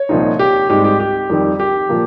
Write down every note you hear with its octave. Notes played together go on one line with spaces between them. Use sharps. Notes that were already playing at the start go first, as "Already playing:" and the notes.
Already playing: C#5
C2 A#2 F3 C4 D#4
G4
G#2 G3 C4 D#4 G4
G4
G4
F2 D#3 G3
G4
A#2 F3 A#3